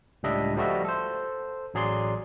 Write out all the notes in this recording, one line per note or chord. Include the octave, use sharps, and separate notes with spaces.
C#2 A2 G3 D4 D#5 E5
F3 G3 A3 F#4 D#5 E5
A4 C5
A1 F#3 G#4 D5 C6